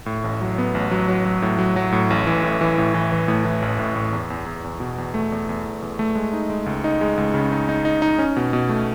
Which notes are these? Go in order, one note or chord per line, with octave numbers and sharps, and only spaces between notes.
A2
A1
F#3
B3
A1
F#3
F#3
F#3
A2
F#3
F#3
A2
A1
E3
A2
E3
A2
E3
E3
A2
E3
A1
A2
A2
E2
E2
E2
E2
B2
E2
A3
E2
E2
E2
E2
A3
G#3
D#4
G#3
C#2
D#4
G#3
C#2
C#3
D#4
D#4
D#4
D#4
C#4
B2
B2
A3